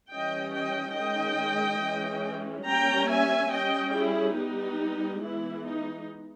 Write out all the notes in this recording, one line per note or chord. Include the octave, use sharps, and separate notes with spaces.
E3 G3 C#4 D#5 G5
D#5 G5
D#3 G#3 C#4 D#5 G5
E3 G#3 C#4
G3 A#3 C#4 G5 A#5
E5 G#5
G3 C#4 D#5 G5
E4 G#4
G3 B3 D#4 G4
E3 G#3 B3 E4
D#4